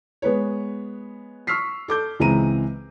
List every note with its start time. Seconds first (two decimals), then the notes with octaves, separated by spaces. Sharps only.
0.22 G#3 B3 B4 C#5
1.47 C#6 E6 F6 B6 C7
1.88 A4 D6 G6
2.20 C#2 E3 G#3 C4 A#5 D#7